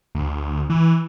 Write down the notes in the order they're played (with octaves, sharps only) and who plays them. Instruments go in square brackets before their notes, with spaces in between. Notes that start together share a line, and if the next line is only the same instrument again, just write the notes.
[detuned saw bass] D2
E3